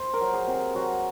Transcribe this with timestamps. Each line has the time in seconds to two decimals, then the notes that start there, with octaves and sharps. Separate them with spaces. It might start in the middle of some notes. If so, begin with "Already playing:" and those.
Already playing: C5
0.14 A#4
0.21 F#3
0.34 G#4
0.48 C3
0.55 G#4
0.75 F#3 F#4